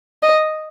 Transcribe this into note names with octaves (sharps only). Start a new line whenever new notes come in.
D#5